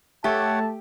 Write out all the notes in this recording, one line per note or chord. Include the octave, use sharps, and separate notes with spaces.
A3 G4 C#5 E5 F#5 A5